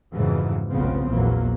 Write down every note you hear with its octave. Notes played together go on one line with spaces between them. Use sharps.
F2 G#2 C#3 E3 F#3
F1 B1 C#3 F3 B3 C4
A#1 E2 E3 F#3 A#3